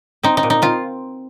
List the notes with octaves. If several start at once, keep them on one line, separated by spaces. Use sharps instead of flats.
C4 D#4
D#4
A#2
D#4
C4 F4